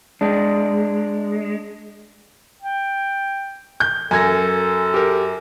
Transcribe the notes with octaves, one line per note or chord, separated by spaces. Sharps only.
G#3 D4
G5
G6
F#2 A4 G#5 G#6 A#6
G4 A#4